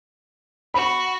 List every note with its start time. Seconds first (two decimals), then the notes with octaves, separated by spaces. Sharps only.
0.74 F#4 B5